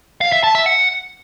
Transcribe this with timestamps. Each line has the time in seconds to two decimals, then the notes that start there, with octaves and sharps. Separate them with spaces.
0.21 F5
0.32 E5
0.44 A5
0.55 E5
0.66 F#5